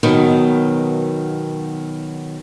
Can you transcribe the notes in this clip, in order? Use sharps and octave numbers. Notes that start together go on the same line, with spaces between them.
B2 D#3 F#3 B3